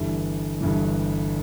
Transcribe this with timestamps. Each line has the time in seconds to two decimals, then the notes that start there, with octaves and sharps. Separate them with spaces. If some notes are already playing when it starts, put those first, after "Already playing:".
Already playing: G1 G2 E3
0.61 G1 G2 E3